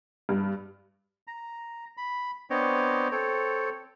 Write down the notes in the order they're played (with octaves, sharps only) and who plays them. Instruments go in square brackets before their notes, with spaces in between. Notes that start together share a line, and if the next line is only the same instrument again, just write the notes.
[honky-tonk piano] G2
[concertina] A#5
B5
B3 C4 D4 C#5 D#5 G5
C4 A4 C#5 G5